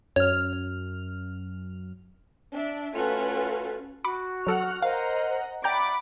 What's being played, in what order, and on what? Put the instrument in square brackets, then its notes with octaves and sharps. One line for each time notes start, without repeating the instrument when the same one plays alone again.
[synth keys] F#2 F6 [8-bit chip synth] C#5
[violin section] D4 E5
A3 C#4 F4 F#4 A4 B4
[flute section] F#4 [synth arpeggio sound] B5 D6 C#7
[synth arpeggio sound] F#3 A4 C#7 [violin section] F#5 F6
[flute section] A#4 C5 [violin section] D#5 F#5 A#5 [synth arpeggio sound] F5
[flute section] D5 E5 [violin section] F#5 B5 D6 [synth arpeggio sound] G5 A#5 G6